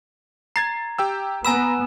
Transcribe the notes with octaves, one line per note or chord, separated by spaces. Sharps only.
A#5 G#6 A6 C7
G4 G5 E6
B3 G#5 A#5 B5 E6 E7